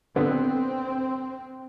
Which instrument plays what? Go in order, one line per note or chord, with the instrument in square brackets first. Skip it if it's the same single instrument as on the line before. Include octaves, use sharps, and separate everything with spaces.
[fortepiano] D3 B3 [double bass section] C4